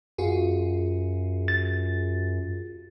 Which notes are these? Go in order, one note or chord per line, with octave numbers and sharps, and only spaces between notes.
F#2 F4 F#4 G#4
A6